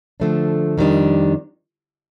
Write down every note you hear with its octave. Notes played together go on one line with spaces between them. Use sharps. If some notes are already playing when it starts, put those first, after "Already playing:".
D3 F3 A3 D4
F2 D#3 G3 D4